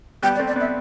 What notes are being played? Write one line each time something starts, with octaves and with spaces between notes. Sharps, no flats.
G3 B3 G5
D5
A3 C4
D5
B3 D4 E5